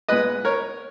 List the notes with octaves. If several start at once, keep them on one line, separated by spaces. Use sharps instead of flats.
A#2 G#3 B3 B4 D#5
A#4 C#5